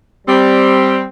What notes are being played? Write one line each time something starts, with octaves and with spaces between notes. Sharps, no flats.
G3 C4